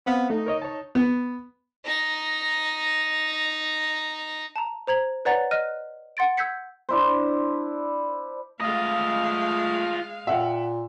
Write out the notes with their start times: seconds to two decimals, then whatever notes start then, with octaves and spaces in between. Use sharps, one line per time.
0.06 B3 C4 F5
0.30 A3 D#4
0.46 A#4 C#5 D#5
0.62 C#5 A5
0.95 B3
1.85 D#4 A#5
4.56 A5 A#5
4.87 C5 A#5 G#6 F#7
5.25 B4 C#5 D5 F#5 A#5 A6
5.51 D#5 F6 F#6 D#7
6.17 F#5 C6 A6 D7
6.37 E6 G6 G#6 B6 C#7
6.89 D4 E4 C5
8.61 G#3 A3 F4 D#5 F5
10.27 A#2 E5 F#5 G5